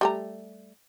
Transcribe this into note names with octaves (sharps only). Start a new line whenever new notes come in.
G3 A3 A#5